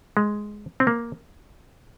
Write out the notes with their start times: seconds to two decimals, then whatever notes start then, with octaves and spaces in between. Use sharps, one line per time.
0.17 G#3
0.80 C4
0.87 A#3